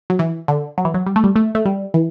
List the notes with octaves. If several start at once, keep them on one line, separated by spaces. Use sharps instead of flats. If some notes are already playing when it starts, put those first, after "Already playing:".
F#3
E3
D3
F#3
E3
F#3
G3
A3
G3
A3
A3
G3
E3